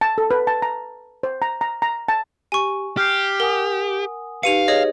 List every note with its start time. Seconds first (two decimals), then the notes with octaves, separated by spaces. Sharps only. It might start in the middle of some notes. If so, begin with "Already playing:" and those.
0.01 A5
0.18 A4
0.31 B4
0.47 A5
0.62 A#5
1.23 C5
1.42 A#5
1.61 A#5
1.82 A#5
2.08 A5
2.52 G4 G#5 C#6
2.97 G4 F6 G6 C7
3.40 A#4 F#5 G#5 D#6
4.43 D#4 G4 B4 F5 C#7 D#7 F7
4.68 G#4 C#5 D#5